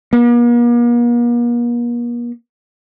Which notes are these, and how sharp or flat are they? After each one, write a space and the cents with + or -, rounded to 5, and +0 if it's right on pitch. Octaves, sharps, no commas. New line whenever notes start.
A#3 +45